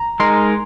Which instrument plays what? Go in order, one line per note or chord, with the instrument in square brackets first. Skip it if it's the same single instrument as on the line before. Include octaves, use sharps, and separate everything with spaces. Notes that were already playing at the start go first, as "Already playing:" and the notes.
Already playing: [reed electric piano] A#5
[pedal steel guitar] G#3 D#4 A#4 [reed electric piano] C6